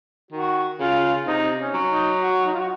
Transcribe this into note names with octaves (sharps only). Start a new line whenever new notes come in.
D#3 F#4
C#3 F4
C3 D#4
C#4
F#3
D#4
F#4
D#4
F4
F#4